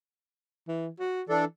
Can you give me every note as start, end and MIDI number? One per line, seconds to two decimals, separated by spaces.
0.68 0.89 52
1.00 1.22 66
1.29 1.46 52
1.29 1.45 62
1.29 1.45 69